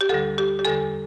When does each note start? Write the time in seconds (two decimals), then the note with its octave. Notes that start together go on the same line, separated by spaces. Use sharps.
0.01 G4
0.09 D2 D3 G3 A4
0.38 G4
0.59 G4
0.65 E2 D3 G3 A4